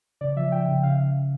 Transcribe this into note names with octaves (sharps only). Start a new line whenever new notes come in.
C#3 D5
F3 E5
F3 G5
C#3
C#3 F5